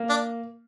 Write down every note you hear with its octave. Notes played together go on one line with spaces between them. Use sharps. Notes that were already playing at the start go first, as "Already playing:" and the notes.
Already playing: A#3
D4